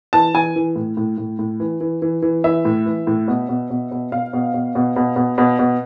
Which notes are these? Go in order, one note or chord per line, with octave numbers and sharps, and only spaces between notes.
E3 A5
E3 G#5
E3
A2
A2
A2
A2
E3
E3
E3
E3
E3 E5
A2
E3
A2
B2
B2
B2
B2
B2 F5
B2
B2
B2
B2
B2
B2
B2